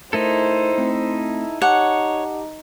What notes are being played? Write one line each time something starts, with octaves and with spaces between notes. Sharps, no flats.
A3 D#4 E4 A4 A#4 C5
A3 C4
D#4 G4 C#5 F#5 A5 D6